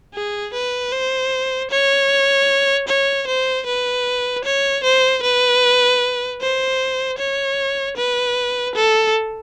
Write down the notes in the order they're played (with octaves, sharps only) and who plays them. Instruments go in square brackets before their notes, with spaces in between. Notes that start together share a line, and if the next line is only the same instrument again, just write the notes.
[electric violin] G#4
B4
C5
C#5
C#5
C5
B4
C#5
C5
B4
C5
C#5
B4
A4